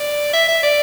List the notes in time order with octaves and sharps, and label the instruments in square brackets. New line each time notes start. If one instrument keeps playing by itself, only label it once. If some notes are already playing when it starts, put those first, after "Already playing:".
Already playing: [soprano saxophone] D5
E5
E5
D5